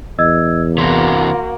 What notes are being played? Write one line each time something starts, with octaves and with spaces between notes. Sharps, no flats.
E2 D#5 E6 G#6
C3 E3 A#3 F#4 C6 A#6